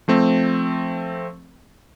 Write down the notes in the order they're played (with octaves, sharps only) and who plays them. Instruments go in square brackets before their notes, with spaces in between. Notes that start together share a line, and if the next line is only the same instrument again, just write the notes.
[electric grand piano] F3 A3 C4